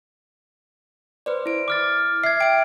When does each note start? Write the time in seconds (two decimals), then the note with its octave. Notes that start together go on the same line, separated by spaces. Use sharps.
1.26 B4 C5 D5
1.46 E4 D7
1.68 D6 F6 A6
2.24 E5 G#6 C7
2.41 E5 G5 D7